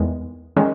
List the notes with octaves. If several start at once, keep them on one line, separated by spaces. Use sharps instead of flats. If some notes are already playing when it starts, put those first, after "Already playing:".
Already playing: E2 D#3 G#3
D#3 G#3 C#4